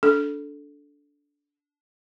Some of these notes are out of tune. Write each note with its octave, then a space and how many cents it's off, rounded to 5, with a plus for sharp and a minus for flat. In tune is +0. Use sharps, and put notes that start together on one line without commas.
D4 -20 A4 -10